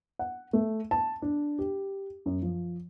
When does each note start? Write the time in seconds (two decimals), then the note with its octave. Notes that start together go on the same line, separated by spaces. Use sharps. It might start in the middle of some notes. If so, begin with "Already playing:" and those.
0.19 F#5
0.53 A3
0.91 A5
1.22 D4
1.59 G4
2.26 F#2
2.42 F3